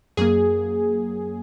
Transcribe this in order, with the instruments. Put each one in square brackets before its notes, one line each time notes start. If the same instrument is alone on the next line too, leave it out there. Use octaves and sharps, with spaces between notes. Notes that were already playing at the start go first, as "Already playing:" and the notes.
[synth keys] F#2 F#3 A#3 G#4